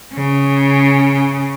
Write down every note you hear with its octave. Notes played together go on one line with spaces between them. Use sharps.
C#3